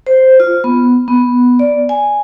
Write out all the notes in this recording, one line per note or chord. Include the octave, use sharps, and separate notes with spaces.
C5
F4
B3
B3
D5
G#5